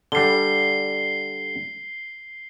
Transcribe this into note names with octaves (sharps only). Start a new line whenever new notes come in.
D3 G3 C7 G7